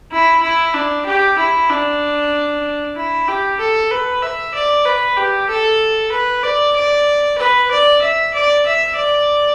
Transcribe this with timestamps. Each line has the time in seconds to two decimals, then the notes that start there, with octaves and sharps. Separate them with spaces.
0.12 E4
0.42 E4
0.74 D4
1.05 G4
1.38 E4
1.69 D4
2.96 E4
3.28 G4
3.60 A4
3.91 B4
4.22 E5
4.54 D5
4.85 B4
5.17 G4
5.49 A4
6.12 B4
6.43 D5
6.76 D5
7.38 B4
7.71 D5
8.02 E5
8.34 D5
8.66 E5
8.96 D5